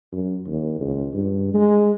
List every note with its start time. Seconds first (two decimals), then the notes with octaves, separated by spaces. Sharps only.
0.12 F#2
0.47 D#2
0.81 C#2
1.14 G2
1.54 G#3